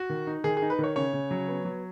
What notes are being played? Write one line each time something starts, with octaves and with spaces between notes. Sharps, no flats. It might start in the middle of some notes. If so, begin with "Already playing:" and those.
Already playing: F#4
D#3
D#4
D#3 G#4
G#4
D#4
B4
D#3
C#5
C#3 C#5
C#3
F#3
B3
F#3